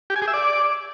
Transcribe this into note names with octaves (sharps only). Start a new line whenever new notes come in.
G4
G#5
G#4
E5
D5